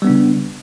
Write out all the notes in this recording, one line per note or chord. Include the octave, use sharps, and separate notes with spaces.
C#3 G3 B3 D4